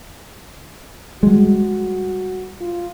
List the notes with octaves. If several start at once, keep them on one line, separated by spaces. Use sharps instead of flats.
G3 G#3 F#4
F4